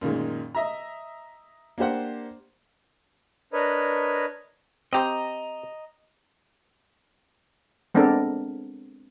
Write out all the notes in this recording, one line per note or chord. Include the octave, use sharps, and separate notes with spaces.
F#2 A#2 D#3 G#3
D#5 E5 A#5
A#3 D4 G4 C5 F#5
D4 A#4 B4 C#5 D#5
C4 G4 C5 D#5 A#5
G#3 B3 C4 D4 A4 A#4